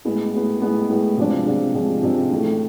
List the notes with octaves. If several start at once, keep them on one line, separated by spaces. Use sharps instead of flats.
A2 G#3 B3
A2 G#3 B3
A2 G#3 B3
A2 G#3 B3
C3 F3 G#3 D4
C3 F3 G#3 D4
C3 F3 G#3 D4
C3 F3 G#3 D4
A2 E3 A3